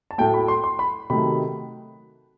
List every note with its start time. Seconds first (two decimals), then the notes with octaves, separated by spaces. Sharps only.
0.11 A5
0.18 A2 F#3 A3 G5
0.34 B5
0.48 C6
0.64 C6
0.79 B5
1.10 C3 D#3 F#3 A3 B5